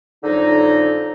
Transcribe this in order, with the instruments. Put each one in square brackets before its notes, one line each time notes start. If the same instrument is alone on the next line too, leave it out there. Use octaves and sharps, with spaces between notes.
[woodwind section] F2 D3 F#3 D#4